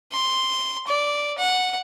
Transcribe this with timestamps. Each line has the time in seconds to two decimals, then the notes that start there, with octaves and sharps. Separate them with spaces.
0.12 C6
0.87 D5
1.38 F#5